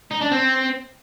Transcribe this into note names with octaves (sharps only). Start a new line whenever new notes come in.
D#4
D4
C4